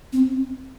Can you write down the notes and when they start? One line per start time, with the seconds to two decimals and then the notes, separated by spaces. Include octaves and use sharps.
0.13 C4